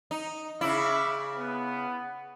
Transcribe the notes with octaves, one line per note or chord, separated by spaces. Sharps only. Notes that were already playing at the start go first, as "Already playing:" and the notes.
D#4
C#3 E4 E5 D6
B3